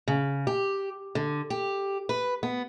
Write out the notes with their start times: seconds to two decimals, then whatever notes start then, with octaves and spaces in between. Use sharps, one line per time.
0.08 C#3
0.47 G4
1.15 D3
1.50 G4
2.09 B4
2.43 B3